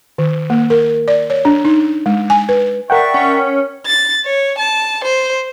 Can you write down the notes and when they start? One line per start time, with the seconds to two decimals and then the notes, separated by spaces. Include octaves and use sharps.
0.18 D#3
0.50 A#3
0.70 A#4
1.08 D5
1.30 C#5
1.45 D4
1.65 D#4
2.06 G#3
2.30 G#5
2.49 B4
2.90 A#4 D5 E5 F#5 G5 C#6
3.14 C#4
3.86 A6
4.25 C#5
4.58 A5
5.04 C5